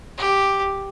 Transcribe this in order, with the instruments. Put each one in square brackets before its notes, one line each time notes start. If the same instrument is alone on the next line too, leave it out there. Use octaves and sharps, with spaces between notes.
[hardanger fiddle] G4